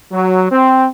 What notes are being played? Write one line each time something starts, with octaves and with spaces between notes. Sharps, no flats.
F#3
C4